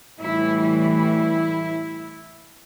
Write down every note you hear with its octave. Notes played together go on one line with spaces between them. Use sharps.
A2 E3 G3 E4
E4